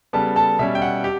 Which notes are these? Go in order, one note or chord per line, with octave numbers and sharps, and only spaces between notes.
C#3 G3 B3 A4 A5
A4 A5
B2 G3 C#4 E5
G5
F#5
G4